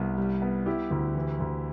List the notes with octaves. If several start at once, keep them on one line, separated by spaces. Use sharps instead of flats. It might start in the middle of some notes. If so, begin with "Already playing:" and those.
Already playing: C2 B3
G3
B3
G3 E4 G4
D2
E3
D2